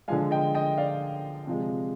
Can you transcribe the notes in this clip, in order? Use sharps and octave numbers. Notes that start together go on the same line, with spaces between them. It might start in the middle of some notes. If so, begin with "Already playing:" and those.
D3 F3 G#3 F5 G#5
D#5 G5
D#5 G5
D5 F5
C3 F3 G#3